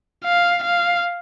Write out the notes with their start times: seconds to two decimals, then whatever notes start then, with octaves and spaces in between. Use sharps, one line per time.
0.24 F5
0.64 F5